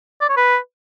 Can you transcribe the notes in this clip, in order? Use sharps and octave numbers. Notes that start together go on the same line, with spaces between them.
D5
C#5
B4